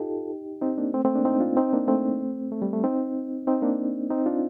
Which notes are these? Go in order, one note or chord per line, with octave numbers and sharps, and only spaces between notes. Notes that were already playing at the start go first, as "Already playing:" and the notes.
Already playing: D#4 F4 G4 A4
C4 D#4
A#3 D4
A3 C4
A3 C4
A#3 D4
C4 D#4
D4 F4
C4 D#4
A#3 D4
A3 C4
A3
G3
A3
C4 D#4
C4 D#4
A#3 D4
C4 D#4
D4 F4